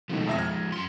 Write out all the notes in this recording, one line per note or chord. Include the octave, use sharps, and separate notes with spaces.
B2 D#3 F3 G#3 A3
F2 E5 A#6
F6 G#6
F#2 C6